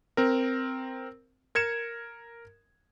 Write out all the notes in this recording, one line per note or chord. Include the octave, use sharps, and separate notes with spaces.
C4 A#4
A#4 G#6 C#7 E7